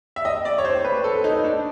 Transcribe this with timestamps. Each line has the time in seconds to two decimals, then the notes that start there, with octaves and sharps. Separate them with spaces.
0.16 E5
0.25 D#5
0.45 D5
0.58 C#5
0.65 C5
0.85 B4
1.04 A4
1.24 D#4
1.44 D4